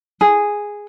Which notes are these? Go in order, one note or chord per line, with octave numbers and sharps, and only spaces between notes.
G#4